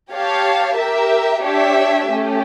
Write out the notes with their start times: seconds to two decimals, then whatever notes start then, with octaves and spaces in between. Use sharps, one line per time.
0.11 G4 C#5 F5 A5
0.78 G4 A#4 E5
1.44 D4 G4 C#5 E5
2.11 A3 C#4 G4